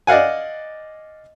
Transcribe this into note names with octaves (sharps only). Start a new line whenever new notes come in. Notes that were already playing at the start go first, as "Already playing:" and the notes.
D5 D#5 F5 F#5 G#5